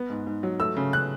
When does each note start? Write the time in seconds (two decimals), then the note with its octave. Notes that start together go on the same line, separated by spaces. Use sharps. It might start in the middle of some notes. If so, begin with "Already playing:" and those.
Already playing: B3
0.10 G#2
0.26 G#2
0.43 F#3
0.60 A3 E6
0.76 C#3
0.93 C#3 F#6